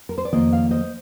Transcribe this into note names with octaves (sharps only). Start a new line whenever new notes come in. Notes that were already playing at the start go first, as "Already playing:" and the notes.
A#4
C5
D5
F2 D#3 A#3 F4 C5 D#5
D5 F5
C5 D#5